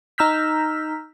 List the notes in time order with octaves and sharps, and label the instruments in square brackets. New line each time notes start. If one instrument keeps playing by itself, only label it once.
[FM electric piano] D#4 A#5 E6 F6 G6 B6